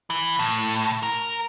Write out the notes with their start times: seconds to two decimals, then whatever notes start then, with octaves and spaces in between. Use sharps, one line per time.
0.10 E3
0.39 A2
1.03 A#4